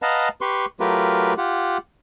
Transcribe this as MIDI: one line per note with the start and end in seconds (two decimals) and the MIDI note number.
0.02 0.28 71
0.02 0.28 75
0.02 0.28 77
0.02 0.28 78
0.02 0.28 81
0.02 0.28 82
0.41 0.66 67
0.41 0.66 71
0.41 0.66 84
0.41 0.66 85
0.80 1.34 54
0.80 1.34 57
0.80 1.34 65
0.80 1.34 67
0.80 1.34 70
0.80 1.34 71
1.38 1.78 65
1.38 1.78 67
1.38 1.78 78